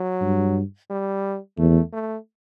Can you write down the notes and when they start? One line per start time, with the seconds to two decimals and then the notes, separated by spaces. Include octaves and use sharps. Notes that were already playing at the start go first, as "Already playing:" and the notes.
Already playing: F#3
0.21 G2
0.90 G3
1.58 E2 A3
1.93 A3